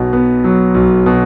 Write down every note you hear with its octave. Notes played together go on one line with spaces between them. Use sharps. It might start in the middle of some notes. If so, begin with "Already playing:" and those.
Already playing: B1 B2
B3
F#3
B1
B2